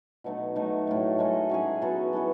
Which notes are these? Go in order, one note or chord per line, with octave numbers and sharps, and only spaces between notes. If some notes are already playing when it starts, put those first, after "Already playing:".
B2 F#3 A3 D#4
F#3 A3 D#4 F#4
A2 F#3 A3
D#3 G#3 D#4 A4
F#3 C#4 G#4
F#3 B3 F#4 A4
E3 B3 F#4 A4